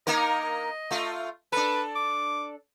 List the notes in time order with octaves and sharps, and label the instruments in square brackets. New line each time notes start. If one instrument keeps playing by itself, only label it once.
[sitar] A#3 D#4 A#4 [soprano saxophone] D#5
[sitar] A3 F4
[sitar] D4 A4 [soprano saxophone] B4
[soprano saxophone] D6